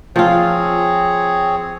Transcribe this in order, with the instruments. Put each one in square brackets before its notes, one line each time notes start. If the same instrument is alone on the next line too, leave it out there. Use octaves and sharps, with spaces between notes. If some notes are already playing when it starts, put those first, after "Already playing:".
[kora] F3 F4 [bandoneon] C4 G#4 C#5